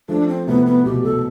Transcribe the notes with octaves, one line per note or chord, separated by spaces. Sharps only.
F3 A3 D4
C4
A2 C3 B3
B3
B2 G4
B2 A4